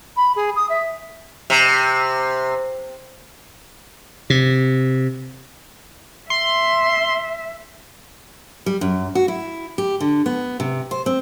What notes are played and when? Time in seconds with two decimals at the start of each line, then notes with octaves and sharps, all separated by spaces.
0.16 B5
0.36 G#4
0.55 D#6
0.69 E5
1.50 C3
4.30 C3
6.30 E5 C6
8.66 G3
8.81 F#2
9.15 F#4
9.28 E4
9.78 G4
10.00 D3
10.26 B3
10.60 C3
10.91 C5
11.06 C4